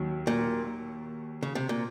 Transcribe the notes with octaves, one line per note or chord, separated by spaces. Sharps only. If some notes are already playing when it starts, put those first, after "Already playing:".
Already playing: D#2 D#3 F#3
A#2
C#3
C3
A#2